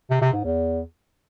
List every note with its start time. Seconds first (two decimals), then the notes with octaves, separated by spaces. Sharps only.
0.10 C3
0.22 C3
0.33 G#2
0.44 E2